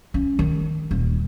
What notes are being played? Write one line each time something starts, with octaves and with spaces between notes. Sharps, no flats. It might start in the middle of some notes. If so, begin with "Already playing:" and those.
C#4
D#3
D#1